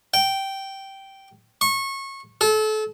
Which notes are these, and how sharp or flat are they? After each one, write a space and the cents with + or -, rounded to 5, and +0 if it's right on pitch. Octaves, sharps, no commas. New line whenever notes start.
G5 -10
C#6 -25
A4 -30